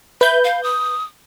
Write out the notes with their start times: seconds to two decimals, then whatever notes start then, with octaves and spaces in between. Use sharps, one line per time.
0.21 B4 E5 G6
0.44 F5
0.63 D#6